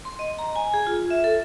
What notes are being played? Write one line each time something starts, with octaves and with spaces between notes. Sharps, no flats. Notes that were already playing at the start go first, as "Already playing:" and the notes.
C6
D#5
A#5
G#5
G#4
F4
E5
A4